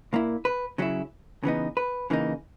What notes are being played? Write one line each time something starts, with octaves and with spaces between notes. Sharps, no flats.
A#2 A#3 E4
B4
C#3 F#3 C#4 E4
C#3 E3 B3 D#4
B4
C#3 E3 A#3 D#4